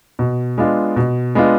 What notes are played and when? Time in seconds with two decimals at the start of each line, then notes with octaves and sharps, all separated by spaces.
0.19 B2
0.58 G#3 B3 D4 F4
0.96 B2
1.35 G#3 B3 D4 F4